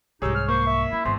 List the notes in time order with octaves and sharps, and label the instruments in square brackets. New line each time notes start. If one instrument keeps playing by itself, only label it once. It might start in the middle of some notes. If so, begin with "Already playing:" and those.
[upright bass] C2 G#2 [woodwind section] D#4 G4 [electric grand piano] G#4 C#5 E6
[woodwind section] F#3 C5 F6
[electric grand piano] A#3 [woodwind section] C5 [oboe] C#6
[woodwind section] E5
[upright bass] C#4 [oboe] E4
[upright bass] G#1 [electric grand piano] E2 [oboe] C5